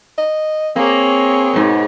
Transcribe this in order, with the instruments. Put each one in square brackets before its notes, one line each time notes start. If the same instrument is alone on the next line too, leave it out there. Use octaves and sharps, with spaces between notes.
[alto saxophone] D#5
[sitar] A#3 [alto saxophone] C4 [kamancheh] G#4 C#5
[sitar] G#2 B2